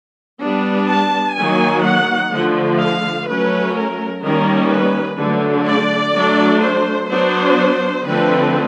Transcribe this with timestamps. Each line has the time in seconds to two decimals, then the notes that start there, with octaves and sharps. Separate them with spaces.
0.42 G3 B3 D4
0.90 A5
1.38 D#3 F#3 A#3 G#5
1.86 F#5
2.33 D3 F3 A3
2.81 F5
3.29 F#3 A3 C#4 B4
3.76 A#4
4.24 D#3 G3 A#3 C#4 A#4
4.72 B4
5.20 D3 F#3 A3 D4
5.68 D5
6.15 F#3 A3 D4
6.63 C5
7.11 F#3 B3 D4 C5
8.06 D3 F3 A3 C4 B4